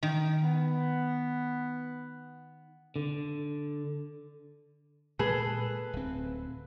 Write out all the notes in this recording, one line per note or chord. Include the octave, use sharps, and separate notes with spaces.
D#3
B3
D3
A#2 G#3 G#4 A4 B4
D1 C4